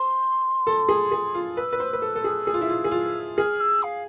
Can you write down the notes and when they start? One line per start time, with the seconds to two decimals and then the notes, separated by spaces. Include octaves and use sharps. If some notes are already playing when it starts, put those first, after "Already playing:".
Already playing: C5 C6
0.67 A4
0.89 G#4
1.12 G#4
1.35 F4
1.57 B4 E6
1.73 B4
1.80 C5
1.93 B4
2.02 A4
2.15 A4
2.24 G#4
2.47 G#4
2.54 F4
2.61 E4
2.69 F4
2.84 G#4
2.91 F4
3.37 G#4 F6
3.60 E6
3.83 F5